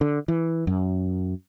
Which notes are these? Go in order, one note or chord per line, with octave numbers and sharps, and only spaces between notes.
D3
E3
F#2